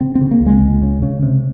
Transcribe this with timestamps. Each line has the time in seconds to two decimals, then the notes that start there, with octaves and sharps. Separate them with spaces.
0.01 C#3 C4
0.15 C4
0.21 C#3
0.31 A#3
0.41 C#2
0.46 G#3
0.62 C#2
0.82 C#3
1.02 C#3
1.23 C3